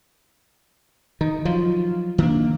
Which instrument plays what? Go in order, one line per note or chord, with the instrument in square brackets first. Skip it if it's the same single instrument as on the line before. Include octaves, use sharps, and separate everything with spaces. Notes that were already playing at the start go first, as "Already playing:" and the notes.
[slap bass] D#3 [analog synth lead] D#4
[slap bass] F3 F#3 [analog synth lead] F4
[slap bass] D#3 D4 [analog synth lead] A#3